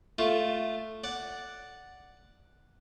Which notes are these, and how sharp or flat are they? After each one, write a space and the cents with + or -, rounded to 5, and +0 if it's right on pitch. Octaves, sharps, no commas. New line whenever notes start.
A3 +0 F4 +0
D5 +0 F#5 +0